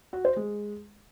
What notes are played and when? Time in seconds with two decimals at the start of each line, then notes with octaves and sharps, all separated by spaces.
0.13 F#4
0.25 C5
0.36 G#3